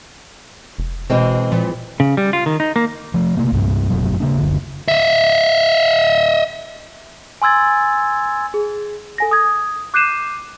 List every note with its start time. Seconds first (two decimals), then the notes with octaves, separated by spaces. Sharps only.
0.78 F1
1.10 B2 E3 G#3 C4
1.52 A#2 F3
2.00 C#3
2.17 G3
2.33 F4
2.46 D#3
2.60 D#4
2.76 A#3
3.14 F3 A3
3.37 C3 A3 A#3
3.52 C2 G2 A#2
3.90 G1 F2 B2 F#3
4.20 C#3 A#3 D4
4.38 F#1 C#2 D3
4.88 D#5 E5
7.42 G#5 C6 E6 G#6 A6
8.54 G#4
9.18 A4 G#5 A#6
9.31 D#6 G#6
9.94 D6 F#6 G6 C7 D#7 E7